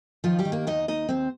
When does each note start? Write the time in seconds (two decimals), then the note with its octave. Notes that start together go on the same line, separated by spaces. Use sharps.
0.24 D#3 F3 F4
0.39 G3 G4
0.45 D#3
0.52 A#3 A#4
0.67 D#2 D#4 D#5
0.88 D#2 D#4 D#5
1.09 D#2 C4 C5